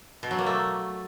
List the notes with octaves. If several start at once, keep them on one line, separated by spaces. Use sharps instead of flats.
B2
F#3
A#3
A3